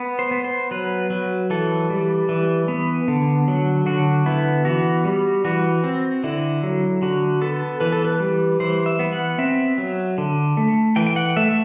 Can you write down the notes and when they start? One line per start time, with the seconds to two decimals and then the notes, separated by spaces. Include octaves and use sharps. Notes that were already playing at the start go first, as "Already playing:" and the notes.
Already playing: B3
0.19 C5
0.31 B3
0.44 C5
0.71 F#3 B4
1.10 F#3
1.50 E3 A4
1.90 G3
2.29 E3
2.68 B3
3.08 D3
3.48 F#3
3.86 D3 F#4
4.26 B3 E4
4.65 E3 F#4
5.05 G3
5.44 E3 F#4
5.84 C4
6.24 D3 E4
6.63 F#3
7.02 D3 F#4
7.41 B3 A4
7.80 E3 B4
7.92 A4
8.05 B4
8.20 G3
8.60 E3 C5
8.86 E5
8.99 B3
9.13 F#5
9.38 C4 E5
9.78 F#3
10.18 D3
10.57 A3
10.96 E3 G5
11.06 G5
11.16 F#5
11.37 A3 E5